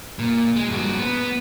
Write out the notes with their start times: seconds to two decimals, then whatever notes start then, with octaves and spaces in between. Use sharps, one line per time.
0.19 A#2
0.56 G#3
0.70 G2 F#4
0.98 B3